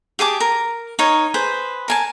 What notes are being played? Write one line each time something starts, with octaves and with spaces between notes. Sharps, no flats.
G4 G#4 A5 D6
A#4
D#4 A#4 C#5
G#4 B4 C5
A#4 G#5 A5